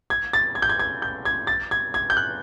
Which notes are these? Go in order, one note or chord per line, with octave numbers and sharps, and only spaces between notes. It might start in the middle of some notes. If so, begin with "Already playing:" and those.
G#6
A6
G#6
G6
G#6
G#6
G6
G#6
A6
G#6
G#6
G6
F#6